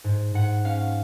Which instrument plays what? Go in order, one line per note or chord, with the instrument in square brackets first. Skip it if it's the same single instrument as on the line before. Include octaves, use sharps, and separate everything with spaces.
[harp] G#2
G#2 F#5
C#4 F5